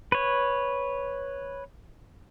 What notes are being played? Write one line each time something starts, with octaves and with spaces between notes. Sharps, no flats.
B4 C#5